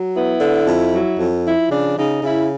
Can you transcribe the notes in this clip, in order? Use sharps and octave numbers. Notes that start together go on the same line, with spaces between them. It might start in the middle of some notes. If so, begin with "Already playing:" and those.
Already playing: F#3
B3 E4
D3
F2
F#3
F2
F3 E4
C#3 D4
C#3 D#4
C#3 E4